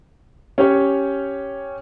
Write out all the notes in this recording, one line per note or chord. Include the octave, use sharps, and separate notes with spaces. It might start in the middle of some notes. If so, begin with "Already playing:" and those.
C#4 G4 C#5